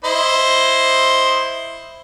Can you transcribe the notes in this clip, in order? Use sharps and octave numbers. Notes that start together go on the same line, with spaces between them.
E4 C5 D#5